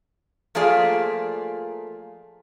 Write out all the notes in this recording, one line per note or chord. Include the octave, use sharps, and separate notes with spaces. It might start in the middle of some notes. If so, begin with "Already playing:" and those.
F3 A3 A#3 F4 G#4 D5